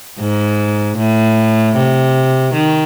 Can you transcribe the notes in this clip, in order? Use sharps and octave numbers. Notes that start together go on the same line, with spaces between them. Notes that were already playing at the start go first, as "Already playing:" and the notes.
G#2
A2
C3
D#3